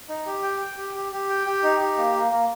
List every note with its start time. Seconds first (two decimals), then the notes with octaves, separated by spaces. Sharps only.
0.09 D#4
0.26 G4
0.43 G5
0.60 G5
0.77 G4
0.95 G4
1.12 G4
1.29 G5
1.46 G4
1.63 D#4
1.80 G4
1.98 A#3
2.15 A#3
2.32 A#3